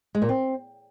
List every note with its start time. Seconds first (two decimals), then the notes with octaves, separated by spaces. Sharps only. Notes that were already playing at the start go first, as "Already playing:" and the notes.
0.15 G#3
0.22 A#2
0.29 C4